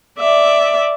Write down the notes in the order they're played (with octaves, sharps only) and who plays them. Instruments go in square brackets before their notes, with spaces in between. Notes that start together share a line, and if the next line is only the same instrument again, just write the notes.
[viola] D5 E5